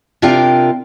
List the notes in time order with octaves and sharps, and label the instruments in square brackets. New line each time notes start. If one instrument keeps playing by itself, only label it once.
[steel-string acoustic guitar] C3 D4 F4 A#4 F5 G5